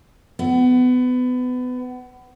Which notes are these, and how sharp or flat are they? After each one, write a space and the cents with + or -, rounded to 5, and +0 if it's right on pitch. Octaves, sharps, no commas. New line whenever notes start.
B3 +25